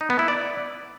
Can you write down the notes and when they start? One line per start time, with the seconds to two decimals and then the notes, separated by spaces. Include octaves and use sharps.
0.01 D#4
0.10 B3
0.19 E4
0.28 D5